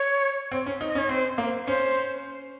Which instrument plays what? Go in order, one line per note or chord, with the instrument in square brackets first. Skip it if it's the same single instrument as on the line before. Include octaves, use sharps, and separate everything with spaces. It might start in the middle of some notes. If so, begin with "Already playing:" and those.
Already playing: [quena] C#5
[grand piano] C4
C#4
D#4
[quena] D#5
[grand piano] C#4
[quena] C#5
[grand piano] C4 [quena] C5
[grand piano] A#3
[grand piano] C#4 [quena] C5